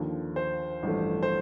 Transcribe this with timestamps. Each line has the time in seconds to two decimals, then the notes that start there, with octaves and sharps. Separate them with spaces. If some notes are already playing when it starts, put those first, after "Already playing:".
Already playing: D#2 D3 F3
0.36 C5
0.83 A1 G2 F3 A3
1.23 C5